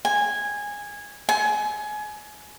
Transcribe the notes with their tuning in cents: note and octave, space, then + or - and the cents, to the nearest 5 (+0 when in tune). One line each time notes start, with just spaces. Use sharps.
G#5 -10
G#5 +25